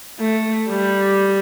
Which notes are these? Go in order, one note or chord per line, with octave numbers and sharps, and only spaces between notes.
A3
G3